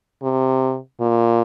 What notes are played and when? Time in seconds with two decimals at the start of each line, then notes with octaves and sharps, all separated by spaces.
0.22 C3
1.01 A#2